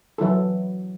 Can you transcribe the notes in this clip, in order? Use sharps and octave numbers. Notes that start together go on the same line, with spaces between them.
E3 F#3 E4 A4